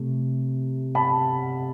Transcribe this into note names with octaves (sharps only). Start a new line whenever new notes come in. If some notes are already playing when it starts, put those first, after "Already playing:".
Already playing: C3 A3
A5 B5